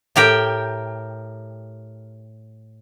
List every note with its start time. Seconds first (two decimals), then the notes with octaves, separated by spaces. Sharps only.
0.16 A2 G4 A#4 G5